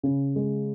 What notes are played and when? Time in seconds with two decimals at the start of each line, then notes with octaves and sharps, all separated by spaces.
0.03 C#3
0.36 G#3